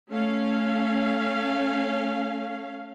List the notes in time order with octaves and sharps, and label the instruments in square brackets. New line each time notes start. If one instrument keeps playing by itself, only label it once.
[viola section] A3 C#4 F5